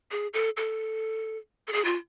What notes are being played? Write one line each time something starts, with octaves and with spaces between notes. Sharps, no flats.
G#4
A4
A4
A4
G#4
F4